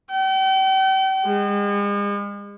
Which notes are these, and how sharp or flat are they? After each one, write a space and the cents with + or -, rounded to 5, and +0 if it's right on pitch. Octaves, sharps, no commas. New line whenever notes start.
G5 -40
G#3 -40